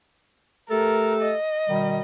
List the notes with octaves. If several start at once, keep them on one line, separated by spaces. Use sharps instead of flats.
A3 G4 A4 A#4
D#5
B2 D#3 G3